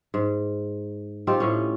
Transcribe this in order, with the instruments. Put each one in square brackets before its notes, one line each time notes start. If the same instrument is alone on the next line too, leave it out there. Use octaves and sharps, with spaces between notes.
[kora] G#2
C4 D#4 F4 G4
A2 C#4